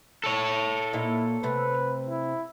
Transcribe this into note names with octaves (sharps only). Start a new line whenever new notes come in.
A4 C#5
A#2 A#3 D#4 E4
C3 A3 B4
E4